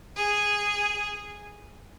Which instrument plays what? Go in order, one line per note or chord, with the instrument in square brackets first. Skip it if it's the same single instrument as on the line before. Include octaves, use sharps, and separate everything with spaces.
[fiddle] G#4